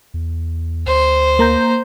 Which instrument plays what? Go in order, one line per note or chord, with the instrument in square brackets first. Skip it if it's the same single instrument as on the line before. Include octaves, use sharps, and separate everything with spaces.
[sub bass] E2
[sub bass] D2 [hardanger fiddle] C5
[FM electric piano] A#3 A#5 G6